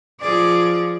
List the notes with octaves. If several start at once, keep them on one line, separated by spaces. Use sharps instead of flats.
F3 G#4 D5